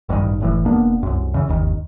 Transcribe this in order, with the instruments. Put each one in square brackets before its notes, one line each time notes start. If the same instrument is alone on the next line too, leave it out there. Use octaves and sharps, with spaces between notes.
[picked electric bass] A1 G2 C3 D#3
F#1 A2 E3
E1 A#3 B3 D4
C2 F#2
C#3 E3
G1 D#2 D#3